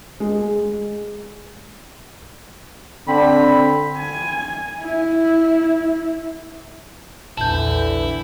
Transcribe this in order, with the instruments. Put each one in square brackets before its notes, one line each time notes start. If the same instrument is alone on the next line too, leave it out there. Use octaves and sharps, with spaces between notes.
[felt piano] G#3
[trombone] D3 [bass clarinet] C4 [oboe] B5
[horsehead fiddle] G#5
E4
[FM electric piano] A#1 E2 [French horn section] D3 E3 [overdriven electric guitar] E4 [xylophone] A5 G6